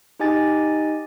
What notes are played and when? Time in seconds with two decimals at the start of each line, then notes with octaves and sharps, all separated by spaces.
0.19 D#4 G4 D#5 G#5 A6